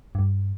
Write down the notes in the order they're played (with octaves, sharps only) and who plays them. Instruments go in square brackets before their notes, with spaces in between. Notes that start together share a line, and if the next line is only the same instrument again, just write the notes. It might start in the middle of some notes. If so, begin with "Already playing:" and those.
[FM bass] G2